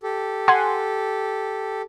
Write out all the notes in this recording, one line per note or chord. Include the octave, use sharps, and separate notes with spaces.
G4 A4
F#5 G#5 C6